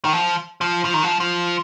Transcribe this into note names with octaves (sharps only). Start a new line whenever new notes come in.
D#3
F3
F3
F3
D#3
F3
F3